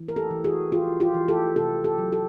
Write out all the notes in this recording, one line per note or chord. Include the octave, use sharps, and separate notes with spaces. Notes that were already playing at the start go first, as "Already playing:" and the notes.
Already playing: E3
A#4
G4 A4
E3
F#4 G#4
E3 F4 G4
F4 G4
E3
G4 A4
C3 G4 A4
G4 A4
F#3
G4 A4